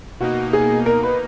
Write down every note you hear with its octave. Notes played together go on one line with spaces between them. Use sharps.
B2 A#3 D#4 F#4
G#4
A#4
B4